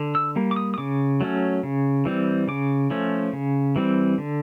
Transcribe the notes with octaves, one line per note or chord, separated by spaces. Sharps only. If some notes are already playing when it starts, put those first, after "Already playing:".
Already playing: D3
E6
G3 A#3
D6
D#6
D#6
C#3 D6
F#3 A3 C#4
C#3
E3 G3 C4
C#3 D6
F3 A3 C#4
C#3
E3 G3 C4
D3